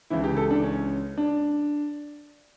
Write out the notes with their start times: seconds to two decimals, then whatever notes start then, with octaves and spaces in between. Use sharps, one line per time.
0.10 C#2 C#3 E3 E4
0.24 G4
0.37 A4
0.51 D4
0.64 C#4
1.18 D4